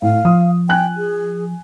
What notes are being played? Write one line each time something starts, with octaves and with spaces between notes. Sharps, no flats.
A2 F5
F3 D#6
G5 G#5 F#6
G#4